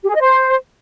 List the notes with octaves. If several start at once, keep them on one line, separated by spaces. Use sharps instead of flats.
G4
G#4
D#5
C5